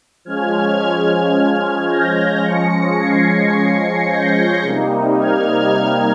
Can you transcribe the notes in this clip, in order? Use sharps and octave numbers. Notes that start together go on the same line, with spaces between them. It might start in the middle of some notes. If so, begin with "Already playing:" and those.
F3 G#3 C#4 F6 G#6
G6 A#6
F3 G#3 C#4 A#6 C#7
G#6 C7
G6 A#6
C3 G3 A#3 D#4
F6 G#6